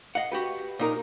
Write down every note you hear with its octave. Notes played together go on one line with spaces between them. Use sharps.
D#5 F5 F#5
F#4 G4 B4
A#2 D#4 A#4